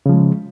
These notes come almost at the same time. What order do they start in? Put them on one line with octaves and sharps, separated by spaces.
C#3 F3 G#3